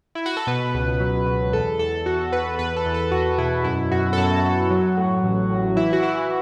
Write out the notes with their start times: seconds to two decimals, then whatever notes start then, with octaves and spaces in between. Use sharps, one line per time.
0.15 E4
0.26 F#4
0.37 A4
0.47 B2 B4
0.74 C#2
1.00 F#3
1.27 B2
1.53 E2 A4
1.79 E2 A4
2.06 E2 F#4
2.33 E2 B4
2.59 E2 B4
2.77 A4
2.86 E2
2.94 A4
3.12 E2 F#4
3.33 F#4
3.38 B2 E4
3.64 F#2 E4
3.91 F#2 F#4
4.13 A4
4.18 F#2 F#4
4.44 F#2
4.71 F#3
4.97 A2
5.24 A1
5.50 A2
5.76 E3 E4
5.93 F#4
6.03 E3 E4